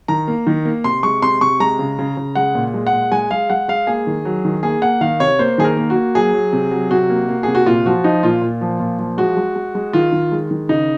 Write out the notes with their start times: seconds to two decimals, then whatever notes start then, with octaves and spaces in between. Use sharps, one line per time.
0.08 D#3 A#5
0.28 A#3
0.47 D#3
0.65 A#3
0.84 C3 C6
1.03 G#3 C#6
1.22 C3 C6
1.41 C3 C#6
1.60 G#3 A#5
1.79 C#3
1.99 C#3
2.17 C#3
2.35 G#3 F#5
2.55 A#2
2.74 G#3
2.87 F#5
2.93 A#2
3.12 G#3 G#5
3.31 G#3 F5
3.50 G#3 F#5
3.68 G#3 F5
3.87 A#3 G#4
4.07 D#3
4.25 F#3
4.45 D#3
4.63 A#3 G#4
4.82 A#3 F#5
5.01 D#3 F5
5.20 C3 C#5
5.39 A#3 C5
5.58 D#3 G#4
5.64 A#4
5.77 A#3
5.90 F#4
5.95 A#3
6.15 F#3 G#4
6.34 F#3
6.53 C3
6.71 F#3
6.91 C3 F#4
7.09 A#3
7.29 A#3
7.43 C3 G#4
7.55 F#4
7.66 A#2 F4
7.86 F3 F#4
8.04 F3 D#4
8.23 A#2 F4
8.42 A#2
8.61 F3
8.80 A#2
8.99 F3
9.18 G#3 F#4
9.37 G#3
9.56 G#3
9.75 G#3
9.93 D#3 F4
10.12 D#3
10.32 G#3
10.51 D#3
10.69 C#3 D#4